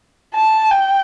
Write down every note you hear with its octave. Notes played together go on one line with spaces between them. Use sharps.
A5
G5